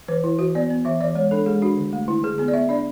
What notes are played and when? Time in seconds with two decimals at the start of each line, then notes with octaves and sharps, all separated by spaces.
0.08 E3 B4
0.24 E3 E4
0.39 E3 F#4
0.55 B3 D5
0.70 B3
0.85 E3 E5
1.01 E3 D5
1.15 G#3 C#5
1.31 D4 A4
1.46 G#3 G#4
1.62 D4 F#4
1.77 D3
1.93 A3
2.08 D3 E4
2.23 D3 G#4
2.38 B3 G#4
2.48 D5
2.54 B3 E5
2.69 D4 D5